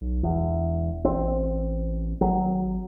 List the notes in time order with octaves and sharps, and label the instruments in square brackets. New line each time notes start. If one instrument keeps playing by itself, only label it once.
[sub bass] B1
[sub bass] E1 [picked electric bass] E2
[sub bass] A1 [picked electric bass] C4
[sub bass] G#1 [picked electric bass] F#3